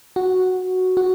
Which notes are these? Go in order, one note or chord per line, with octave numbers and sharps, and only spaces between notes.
F#4
F#4